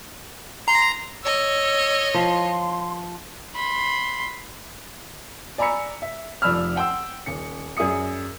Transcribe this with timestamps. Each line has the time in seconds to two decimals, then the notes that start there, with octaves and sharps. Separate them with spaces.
0.68 A#5 C6
1.24 C#5 D#5 E6
2.14 F3 C6
3.55 B5 C6
5.58 D5 G#5 A#5 B5 E6 C#7
6.02 E5
6.42 F1 F3 D5 B5 E6 F6
6.76 F#5 G5 C6 E6
7.26 D#1 C#7
7.77 F#2 G#4 D5 E5 D#6 C#7